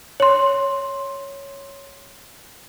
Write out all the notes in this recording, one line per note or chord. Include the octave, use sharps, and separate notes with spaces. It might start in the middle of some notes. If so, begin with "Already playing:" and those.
C#5 C6